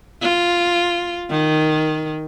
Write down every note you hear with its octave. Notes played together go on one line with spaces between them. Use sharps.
F4
D#3